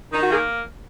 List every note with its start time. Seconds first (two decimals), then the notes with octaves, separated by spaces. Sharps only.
0.13 D#3 D#4
0.21 F#4
0.30 A#3 G#4